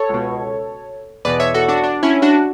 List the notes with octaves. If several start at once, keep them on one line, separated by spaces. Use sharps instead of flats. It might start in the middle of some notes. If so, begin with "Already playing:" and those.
Already playing: A4 C#5
C#2 B2
E2 B2 B4 D5
C#5 E5
F#4 A4
D4 F#4
D4
C#4 E4
D4 F#4